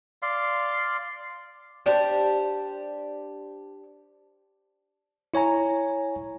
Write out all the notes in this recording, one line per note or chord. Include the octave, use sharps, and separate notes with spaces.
D5 F5 C6
D4 G4 C5
E4 C#5 G#5 A#5